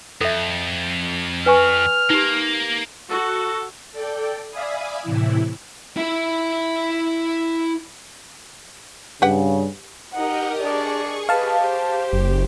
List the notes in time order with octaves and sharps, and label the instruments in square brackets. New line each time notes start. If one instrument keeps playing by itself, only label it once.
[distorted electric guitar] F2 [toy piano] A4 E5
[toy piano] B4 G#5 C#6 [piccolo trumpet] F6
[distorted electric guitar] A#3 [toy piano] D#4 G4
[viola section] F#4 [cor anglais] A4
[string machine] A4 D5 G5
D5 E5 F5 G#5 B5 D#6
A2 C3 E3 E4
[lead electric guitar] E4 E5
[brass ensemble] G2 C#3 [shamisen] G4 B4 F#5
[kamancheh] D#4 F#5 [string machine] G4 A#4 D#5
[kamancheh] D4 D5 [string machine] G#4 C#6
[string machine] G4 [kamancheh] B4 D#5 [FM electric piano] F5 A5
[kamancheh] C5
[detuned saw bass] F#1